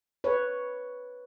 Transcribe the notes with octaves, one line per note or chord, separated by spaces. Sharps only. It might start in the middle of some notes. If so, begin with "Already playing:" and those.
B4 C#5